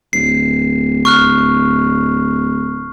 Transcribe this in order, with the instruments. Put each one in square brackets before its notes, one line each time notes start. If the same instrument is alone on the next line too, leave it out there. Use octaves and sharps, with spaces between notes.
[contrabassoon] D1 [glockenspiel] C7
[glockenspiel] C#6 F6 F#6